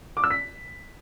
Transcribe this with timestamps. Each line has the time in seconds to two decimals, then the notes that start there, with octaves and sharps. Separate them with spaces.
0.17 D6
0.24 E6
0.31 B6